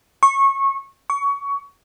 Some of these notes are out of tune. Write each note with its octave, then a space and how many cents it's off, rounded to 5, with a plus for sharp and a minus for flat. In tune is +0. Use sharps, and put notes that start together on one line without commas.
C#6 -20
C#6 +20